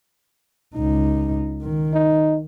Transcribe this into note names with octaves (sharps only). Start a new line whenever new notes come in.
C#2 D#4
D#3
D#4